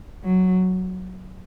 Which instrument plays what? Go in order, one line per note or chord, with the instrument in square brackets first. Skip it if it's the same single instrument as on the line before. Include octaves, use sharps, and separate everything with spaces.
[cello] F#3